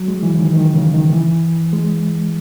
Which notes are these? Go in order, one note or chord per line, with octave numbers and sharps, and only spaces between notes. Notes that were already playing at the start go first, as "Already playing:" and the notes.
Already playing: F#3
G#3
E3
D#3
D#3
C#3
D#3
E3
G#3